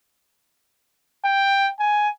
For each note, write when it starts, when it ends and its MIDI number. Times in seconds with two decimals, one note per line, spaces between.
1.25 1.68 79
1.80 2.09 80